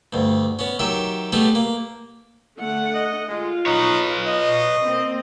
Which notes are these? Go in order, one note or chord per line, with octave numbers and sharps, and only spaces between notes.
D2 G2
B3 C#4
D#3 F#3 G4 E5
G3 A3 B3 G4 G#4
A#3
D3 A3 F#5
D#5
G#3 F4
D#4 B4 C#5
D#5
A#3 C4